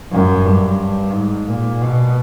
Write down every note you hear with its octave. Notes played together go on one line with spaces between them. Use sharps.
F#2
G2
G#2
A#2
B2